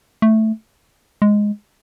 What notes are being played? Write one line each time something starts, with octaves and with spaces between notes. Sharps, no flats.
A3
G#3